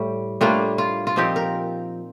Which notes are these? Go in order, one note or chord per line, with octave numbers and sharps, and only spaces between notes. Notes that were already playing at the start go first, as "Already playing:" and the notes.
Already playing: A2 G3
A2 G3 A#3 D4 F4
F4
F4
A#2 F3 C4 D#4 G4
A#4